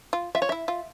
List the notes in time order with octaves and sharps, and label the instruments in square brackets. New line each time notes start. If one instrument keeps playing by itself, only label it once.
[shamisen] F4
[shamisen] F4 [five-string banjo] E5
[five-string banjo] C#5
[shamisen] E4 [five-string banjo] E5
[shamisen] F4